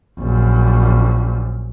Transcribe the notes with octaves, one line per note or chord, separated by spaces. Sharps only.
A#1 F#2